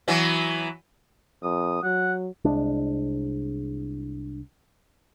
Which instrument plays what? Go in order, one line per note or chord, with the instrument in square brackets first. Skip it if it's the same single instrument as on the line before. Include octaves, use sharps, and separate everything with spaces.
[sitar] E3 F#3 B3
[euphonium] F2 [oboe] D#6
[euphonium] F#3 [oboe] F#5
[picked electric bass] C2 G#3 D4